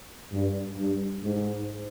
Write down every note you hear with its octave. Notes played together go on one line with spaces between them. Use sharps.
G2
G2
G#2